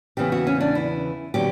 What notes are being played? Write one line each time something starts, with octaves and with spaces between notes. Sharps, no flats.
E2 C#3 E3 B3 G4
F#4
C#4
D4
E4
D3 F#3 B3 G4